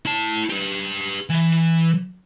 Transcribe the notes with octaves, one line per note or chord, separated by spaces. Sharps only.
E4 A5
G4 B4
E3